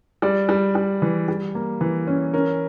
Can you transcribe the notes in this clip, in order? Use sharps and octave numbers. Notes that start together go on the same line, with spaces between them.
G3 D5
G3
G3
E3
G3
A#3
E3
C#4
C#4 A#4